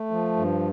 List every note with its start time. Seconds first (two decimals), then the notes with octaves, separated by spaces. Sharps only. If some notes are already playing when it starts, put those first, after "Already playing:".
Already playing: A3
0.11 F3
0.36 G2